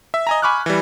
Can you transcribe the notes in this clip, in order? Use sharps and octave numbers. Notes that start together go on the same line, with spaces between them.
E5
D#5 G#5 A#5
G#5 B5 C#6 D6 F6 F#6
E3 G3